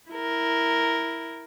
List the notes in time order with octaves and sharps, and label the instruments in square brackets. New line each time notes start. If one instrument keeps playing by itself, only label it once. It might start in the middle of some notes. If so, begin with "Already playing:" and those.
[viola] E4 A#4